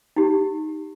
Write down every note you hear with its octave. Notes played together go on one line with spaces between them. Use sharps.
D#4 G4